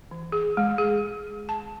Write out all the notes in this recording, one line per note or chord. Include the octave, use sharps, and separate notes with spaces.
E3
G#4
G#3
G#4
A5